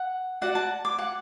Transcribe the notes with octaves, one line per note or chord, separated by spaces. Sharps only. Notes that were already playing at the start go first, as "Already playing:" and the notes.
Already playing: F#5
F#4 D5 F#5
A5
D6
F#5